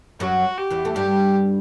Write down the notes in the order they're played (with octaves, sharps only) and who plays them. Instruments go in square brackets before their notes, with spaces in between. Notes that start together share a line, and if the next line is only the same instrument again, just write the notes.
[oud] F#2 F#3 [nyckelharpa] F#4
[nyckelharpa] G4
[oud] E2 E3
A3
[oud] G2 G3 [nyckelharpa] G4